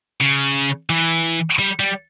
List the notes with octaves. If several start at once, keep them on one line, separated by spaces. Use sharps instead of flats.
C#3
E3
G3
G3